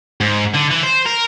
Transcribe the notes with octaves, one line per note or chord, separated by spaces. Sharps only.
G#2
D3
E3
C5
A#4